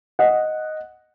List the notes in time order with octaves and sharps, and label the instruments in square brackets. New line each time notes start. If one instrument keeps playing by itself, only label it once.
[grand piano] D#5 F#5